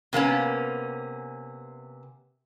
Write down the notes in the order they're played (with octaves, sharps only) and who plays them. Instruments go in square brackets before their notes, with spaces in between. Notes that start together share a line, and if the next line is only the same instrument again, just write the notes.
[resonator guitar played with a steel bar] C3 A#3 B3 C#4